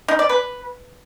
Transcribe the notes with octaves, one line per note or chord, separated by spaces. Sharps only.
D#4
D5
B4